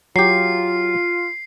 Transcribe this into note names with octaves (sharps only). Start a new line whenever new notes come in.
F#3 F4 G4 C7